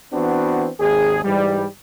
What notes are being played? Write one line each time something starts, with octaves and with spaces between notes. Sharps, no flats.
E3 B3 C4 D4 F#4
G#1 D#2 G#4
G#2 E3 G3